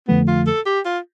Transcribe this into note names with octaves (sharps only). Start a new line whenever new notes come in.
F2 D3 F3 A3 B3
F4
A4
G4
F4